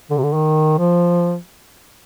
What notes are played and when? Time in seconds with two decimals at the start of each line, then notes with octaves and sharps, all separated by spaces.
0.10 D3
0.18 C3
0.23 D3
0.34 D#3
0.78 F3